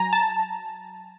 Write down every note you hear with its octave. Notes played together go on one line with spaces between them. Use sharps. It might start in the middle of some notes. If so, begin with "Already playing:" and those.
Already playing: F#3 G#5 A#5
A5